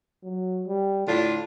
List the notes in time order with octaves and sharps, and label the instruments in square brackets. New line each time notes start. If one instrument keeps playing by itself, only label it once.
[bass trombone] F#3
G3
[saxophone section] A2 D4 F4 [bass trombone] D3